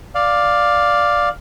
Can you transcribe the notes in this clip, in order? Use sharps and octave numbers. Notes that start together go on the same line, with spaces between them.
D5 F5